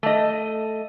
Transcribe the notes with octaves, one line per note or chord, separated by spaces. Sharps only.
A3 D#5